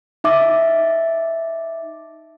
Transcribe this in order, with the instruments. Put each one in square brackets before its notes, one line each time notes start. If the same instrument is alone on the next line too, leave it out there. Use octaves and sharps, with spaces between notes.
[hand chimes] D#4 E5 D6 A6